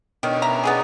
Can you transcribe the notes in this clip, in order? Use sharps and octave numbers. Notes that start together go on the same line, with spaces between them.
B2 D#3 C#4 D4
E5 A#5
B3 D#4 G#4